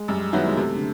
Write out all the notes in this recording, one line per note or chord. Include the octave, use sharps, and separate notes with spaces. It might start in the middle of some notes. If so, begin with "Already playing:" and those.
Already playing: G#3
F#2 G3
D#3 F#3 B3 E4
G#3
C3 A3
D3